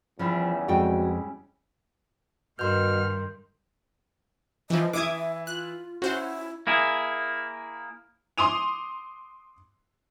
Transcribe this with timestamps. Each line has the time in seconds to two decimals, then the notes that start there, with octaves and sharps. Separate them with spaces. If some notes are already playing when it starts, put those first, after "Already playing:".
0.19 E2 C#3 F3 G3 E4
0.68 F2 G#3 F#4 G5
2.59 G2 B2 D#3 A#4 C6 F6 G6
4.70 E3 F3 D#5
4.93 E3 E4 E5 D6 D#6 G#6
5.47 F4 F#6
6.02 C#4 E4 F#4 C5 F#5
6.67 A#3 E4 G#4
8.38 C6 D6 D#6 D#7 F7